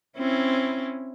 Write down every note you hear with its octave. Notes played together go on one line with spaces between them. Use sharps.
C4 C#4 E4